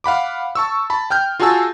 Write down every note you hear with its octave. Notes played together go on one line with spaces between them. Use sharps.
F5 F#5 B5 D6
A5 C#6 E6
A5 B5
G5 F6 G6
F4 F#4 G#4 G#5 A5 E6